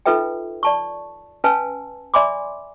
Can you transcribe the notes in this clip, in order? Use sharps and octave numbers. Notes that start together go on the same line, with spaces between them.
D#4 F4 A4 B4 E5 G5
D5 A5 C#6
C#4 B4 F5 G#5 A5 E6
D5 E5 G#5 B5 C6 D6